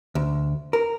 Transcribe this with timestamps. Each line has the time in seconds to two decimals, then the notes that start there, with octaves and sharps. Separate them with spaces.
0.15 D2
0.73 A#4